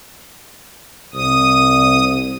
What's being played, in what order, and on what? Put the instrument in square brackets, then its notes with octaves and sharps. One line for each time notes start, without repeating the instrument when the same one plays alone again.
[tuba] C2 [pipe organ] D#6